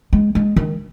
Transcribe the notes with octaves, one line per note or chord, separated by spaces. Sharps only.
G#3
G#3
D#3